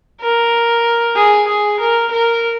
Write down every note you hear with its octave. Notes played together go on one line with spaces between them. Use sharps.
A#4
G#4
G#4
A#4
A#4